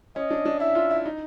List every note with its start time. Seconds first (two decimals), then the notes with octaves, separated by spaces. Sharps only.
0.16 C#4 D#5
0.31 D4
0.45 D4
0.60 E4 E5
0.75 F4
0.91 E4
1.05 D#4